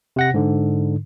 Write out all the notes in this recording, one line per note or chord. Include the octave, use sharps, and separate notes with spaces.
C3 F#5 A#6
G#2 D3